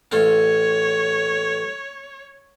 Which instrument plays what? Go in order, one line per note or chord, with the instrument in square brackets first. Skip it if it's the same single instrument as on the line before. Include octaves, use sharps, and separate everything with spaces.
[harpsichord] A1 A4 F5 [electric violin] C#5